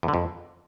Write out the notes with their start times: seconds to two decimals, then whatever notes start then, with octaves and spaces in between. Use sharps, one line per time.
0.03 E2
0.08 D3
0.14 F2